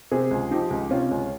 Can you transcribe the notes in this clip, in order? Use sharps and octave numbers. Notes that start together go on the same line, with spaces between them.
C3 G#4 C5
C#2
F3 D#4 G4
C#2
C3 C#4 F4
C#2